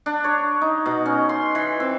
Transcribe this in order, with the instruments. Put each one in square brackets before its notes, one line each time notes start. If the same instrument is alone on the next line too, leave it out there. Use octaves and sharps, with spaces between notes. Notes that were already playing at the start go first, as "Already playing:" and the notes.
[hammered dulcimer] D4
C#5
D#4
B2
C#4
C6
E3
C4